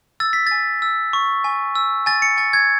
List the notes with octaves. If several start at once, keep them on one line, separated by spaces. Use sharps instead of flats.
E6 A6
B6
G#5 A6
E6
C#6
G#5
E6
G#5 A6
C#7
G#5 A6
G#6